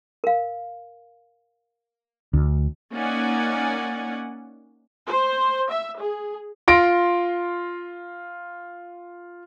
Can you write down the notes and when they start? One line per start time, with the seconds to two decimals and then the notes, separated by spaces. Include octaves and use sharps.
0.24 A#4 F5
2.33 D2
2.93 A#3 C#4 D#4 D5 F#5 G#5
5.07 C5
5.71 E5
6.01 G#4
6.68 F4 C6 A#6 D7